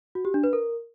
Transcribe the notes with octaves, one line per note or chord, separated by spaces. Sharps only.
F#4
G4
D4
B4
A#4